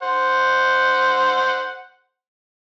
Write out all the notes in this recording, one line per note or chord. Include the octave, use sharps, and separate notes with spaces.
C5 F#5